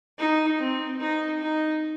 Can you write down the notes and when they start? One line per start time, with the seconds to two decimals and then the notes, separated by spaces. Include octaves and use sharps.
0.18 D#4
0.59 C4
1.00 D#4
1.41 D#4